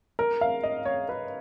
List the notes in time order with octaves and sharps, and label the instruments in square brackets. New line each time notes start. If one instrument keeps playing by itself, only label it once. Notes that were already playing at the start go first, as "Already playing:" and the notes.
[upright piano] A#4
F5
D#5
C#5
B4